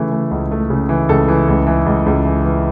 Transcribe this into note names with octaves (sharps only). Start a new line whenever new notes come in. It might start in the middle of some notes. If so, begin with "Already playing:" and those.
Already playing: C#3 E3 A3
A3
C#2
A3
C#3
E3
C#2 A4
E3
C#2
E3
C#2
C#2
E3
E3